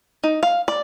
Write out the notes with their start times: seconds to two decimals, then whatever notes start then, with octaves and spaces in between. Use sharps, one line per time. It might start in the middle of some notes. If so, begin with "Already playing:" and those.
0.24 D#4
0.43 F5
0.68 D5